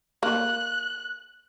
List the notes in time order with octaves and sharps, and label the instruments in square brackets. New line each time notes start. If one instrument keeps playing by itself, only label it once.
[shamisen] A#3 [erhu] F#6